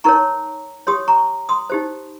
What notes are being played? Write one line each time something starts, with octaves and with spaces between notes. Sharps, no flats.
D#4 A#4 C#5 A#5 C#6
G4 C#5 C6 D#6
A#5 C#6
C6 D#6
D#4 G4 C5